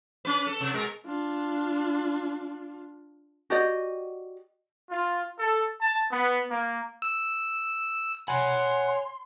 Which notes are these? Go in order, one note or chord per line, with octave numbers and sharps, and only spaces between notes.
C#4 B4
A4
C3
B2 G#3 A#4
D4 F4
F#4 G4 D5 D#5
F4
A4
A5
B3
A#3
E6
C#5 F#5 G#5 B5 C6